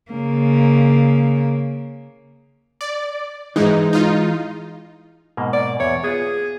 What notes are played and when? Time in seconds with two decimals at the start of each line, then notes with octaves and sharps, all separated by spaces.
0.11 C#3 A#3
2.81 D5
3.56 G#2 E3 G#3 D#4 E4
3.93 D#4 F4
5.37 G#2 B2 A#3
5.53 D5
5.80 E2 C#5
6.04 B3 F4 G#4